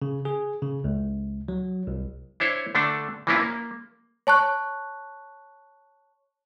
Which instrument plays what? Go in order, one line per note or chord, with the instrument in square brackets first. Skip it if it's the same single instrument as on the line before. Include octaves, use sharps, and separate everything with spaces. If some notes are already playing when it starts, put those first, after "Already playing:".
[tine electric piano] C#3
G#4
C#3
C#2
F#3
C2
[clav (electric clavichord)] D4 E4 C5 C#5
D3 A3 D4 A4
E3 F3 A#3 C#4 E4 F4
A#3
[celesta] C#5 A5 C#6 F#6